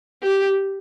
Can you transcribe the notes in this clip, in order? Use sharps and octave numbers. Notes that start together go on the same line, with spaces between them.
G4